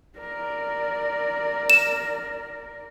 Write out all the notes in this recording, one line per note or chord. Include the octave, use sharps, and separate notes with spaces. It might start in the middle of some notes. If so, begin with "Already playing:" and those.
A#4 D5
E7